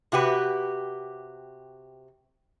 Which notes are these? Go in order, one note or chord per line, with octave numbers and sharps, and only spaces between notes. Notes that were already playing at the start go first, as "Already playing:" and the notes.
C3 F#4 G4 B4